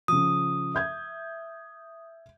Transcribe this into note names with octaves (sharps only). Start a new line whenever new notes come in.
C#3 F3 D#6
E5 G6 G#6